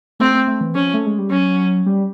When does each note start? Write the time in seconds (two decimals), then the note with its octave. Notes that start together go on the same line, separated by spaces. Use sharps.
0.20 A3 C4
0.34 A3
0.47 A3
0.61 E3
0.75 F3 C#4
0.94 A3
1.06 G#3
1.19 G3
1.30 F#3 C#4
1.86 G3